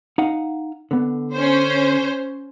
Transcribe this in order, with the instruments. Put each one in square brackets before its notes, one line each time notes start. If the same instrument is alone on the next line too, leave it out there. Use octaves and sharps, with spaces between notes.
[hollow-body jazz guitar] D#4 F5 F#5
D3 B3
[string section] C#4 C5